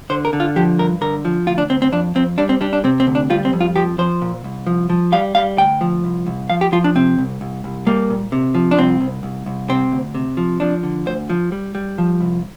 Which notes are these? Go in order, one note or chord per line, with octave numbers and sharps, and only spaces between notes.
D3 C5
A#4
D3
F4
F3 G4
G2 A#4
D3 A#4
F3
D2 F4
D4
D2 C4
C4
F2 D4
F2 C4
G3 D4
C4
G3 D4
D4
C3 C4
C4
D2
D4
G3 F4
C4
F2
F4
F3 G4
F3 C5
A#2
C2
F3
F3
G3 F5
G3 F5
D2 G5
F3
C2
C2
F3 F5
G4
F3 F4
D4
C3 C4
C2
C2
C2
G3 A#3
A#2
C3
F3
D4
C2 C4
C2
C2
C2
C3 C4
D2
C3
F3
F3 D4
D3
D2 C5
F3
G3
G3
F3
C2